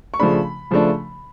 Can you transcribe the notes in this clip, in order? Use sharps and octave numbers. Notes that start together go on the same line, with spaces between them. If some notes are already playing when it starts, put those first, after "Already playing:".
C#6
C#3 F3 A3 D4 B5
C#3 F3 A3 D4